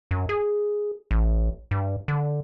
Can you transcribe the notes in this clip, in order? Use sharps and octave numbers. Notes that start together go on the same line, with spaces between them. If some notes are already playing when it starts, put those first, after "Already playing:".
F#2
G#4
A1
G2
D3